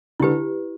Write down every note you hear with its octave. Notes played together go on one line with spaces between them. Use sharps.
D3 E4 G4 B4